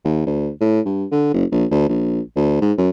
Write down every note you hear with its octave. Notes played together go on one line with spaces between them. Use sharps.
D#2
D2
A2
G2
D3
F#1
A#1
D2
A#1
D2
G#2
F#2